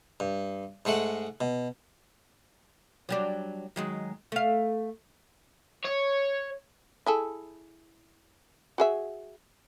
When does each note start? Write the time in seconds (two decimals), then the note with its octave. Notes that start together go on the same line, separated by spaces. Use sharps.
0.20 G2
0.85 G#2 G#3 A3 F#5
1.41 B2
3.09 F#3 G3 D4
3.76 D#3 F#3 G#3
4.32 A3 F5
5.84 C#5
7.06 E4 G#4 A4
8.78 F#4 G#4 E5